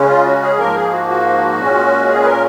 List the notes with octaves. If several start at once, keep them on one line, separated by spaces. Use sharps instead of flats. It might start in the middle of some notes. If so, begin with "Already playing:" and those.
Already playing: C#3 G#3 C#4
F4
F#4
G#4
G#2 F3 A#3 A#4
G#4
F#4
F#4
A#2 G#3 C#4
G#4
B4
A#4